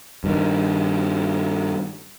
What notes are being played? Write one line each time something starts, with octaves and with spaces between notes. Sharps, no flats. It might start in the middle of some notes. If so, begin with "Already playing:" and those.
G2 D#3